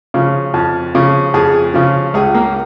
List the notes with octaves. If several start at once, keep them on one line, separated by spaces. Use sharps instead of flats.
C#3 F3
F2
C#3 F3
F2 G#4
C#3 F3
C#2 G#4
A#3